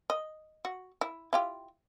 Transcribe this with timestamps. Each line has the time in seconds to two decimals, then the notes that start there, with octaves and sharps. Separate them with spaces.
0.10 D#5
0.65 F#4
1.01 E4
1.33 E4 F4 G4